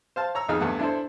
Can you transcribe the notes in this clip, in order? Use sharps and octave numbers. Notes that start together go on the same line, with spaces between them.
C5 F5 A5
C#5 A#5 E6
B1 F2 D#4 G#4 F6
E2 G2 A3 F#5
D4 E4 A4 C5